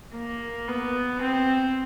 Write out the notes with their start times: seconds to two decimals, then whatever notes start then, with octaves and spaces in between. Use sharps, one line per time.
0.13 A#3
0.68 B3
1.21 C4